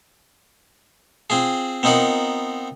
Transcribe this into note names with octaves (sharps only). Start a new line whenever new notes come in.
C4 F4 G#4
B3 C4 D#4 F4 A#4 F#5